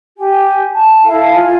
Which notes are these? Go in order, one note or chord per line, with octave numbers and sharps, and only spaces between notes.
G4 G#5
A5
E4 A4 F5 A5
F4 G#5